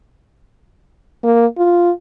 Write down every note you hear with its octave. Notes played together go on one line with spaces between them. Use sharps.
A#3
F4